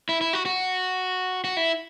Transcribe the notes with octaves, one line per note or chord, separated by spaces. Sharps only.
E4
E4
F#4
F#4
F#4
E4